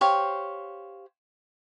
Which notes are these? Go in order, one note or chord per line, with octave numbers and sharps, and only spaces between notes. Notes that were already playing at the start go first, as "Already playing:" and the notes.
G4 C5 C#5 F5